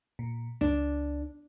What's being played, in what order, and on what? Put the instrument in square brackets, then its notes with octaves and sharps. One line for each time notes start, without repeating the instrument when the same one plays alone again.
[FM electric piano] A#2
[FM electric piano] C#2 [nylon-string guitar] D4